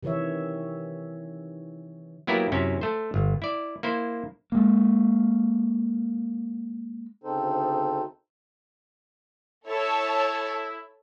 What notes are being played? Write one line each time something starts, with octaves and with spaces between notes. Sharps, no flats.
C3 D#3 E3 C#5 E5
F#3 A#3 B3 E4 G4 A#4
F#2 C3 C#4 E4
A3 C5
G1
E4 D5
A#3 E4 C5
G#3 A#3
D2 C#3 C4 D#4 A4 C5
E4 A4 C#5 A5